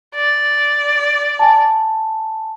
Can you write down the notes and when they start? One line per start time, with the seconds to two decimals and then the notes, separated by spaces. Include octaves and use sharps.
0.15 D5
1.39 G#5 A5